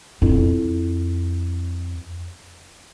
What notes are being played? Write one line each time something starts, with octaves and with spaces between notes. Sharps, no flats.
F2 E4